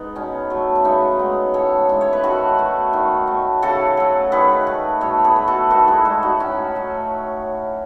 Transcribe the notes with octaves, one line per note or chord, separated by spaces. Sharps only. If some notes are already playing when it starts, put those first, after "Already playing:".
Already playing: G#3 B3 D#4
B2 C#4
F#3 A3
C#4
C#3 B3 D#4
G#3
A2 A4 C#5
E3 G#3
C#5
B4
D#3 F#4 A4
A3
D#3
A3
C#3 F#4 A4
F#3 A3
D#3 G#4 B4
A3
B2 A4 C#5
G#4 B4
A3
F#4 A4
D#3 F#4 A4
E4 G#4
G#3 F#4 A4
D#4 F#4
A2 C#4
F#3 A3